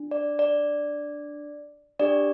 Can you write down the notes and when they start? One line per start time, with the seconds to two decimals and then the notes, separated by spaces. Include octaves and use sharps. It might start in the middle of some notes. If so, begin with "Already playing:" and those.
Already playing: D4
0.11 D5
0.39 D5
1.99 D4 G4 D5